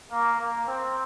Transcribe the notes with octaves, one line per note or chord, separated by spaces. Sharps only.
A#3
A#3
C4